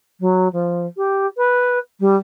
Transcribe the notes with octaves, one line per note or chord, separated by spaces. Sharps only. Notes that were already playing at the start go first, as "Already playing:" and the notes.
F#3
F3
G4
B4
G3